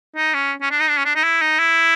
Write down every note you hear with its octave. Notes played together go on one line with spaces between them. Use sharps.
D#4
C#4
C#4
D4
D#4
D4
C#4
D4
D#4
E4
D#4
E4